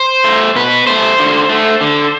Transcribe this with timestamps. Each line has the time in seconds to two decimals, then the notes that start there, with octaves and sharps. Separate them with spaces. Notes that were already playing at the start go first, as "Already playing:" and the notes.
Already playing: C5
0.24 A3
0.56 B2 B4
0.87 A3 C5
1.19 D3
1.49 A3
1.81 D3